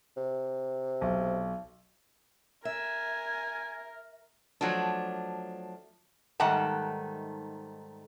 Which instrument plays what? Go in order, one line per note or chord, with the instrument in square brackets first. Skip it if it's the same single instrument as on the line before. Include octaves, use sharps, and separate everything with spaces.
[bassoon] C3
[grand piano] B1
[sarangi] A#4 [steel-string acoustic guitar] E5 [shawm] G#5
[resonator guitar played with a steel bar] F3 F#3 A3 D4
G#2 D#3 G3 A3 F#5 A5